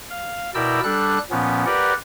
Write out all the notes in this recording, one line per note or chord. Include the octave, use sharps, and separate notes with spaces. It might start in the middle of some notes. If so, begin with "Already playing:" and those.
F5
B2 E4 A#4 D5 G5 E6
G3 D4 A4 F#6
A#2 F3 B3 C#4
G4 A#4 B4 D5 F#5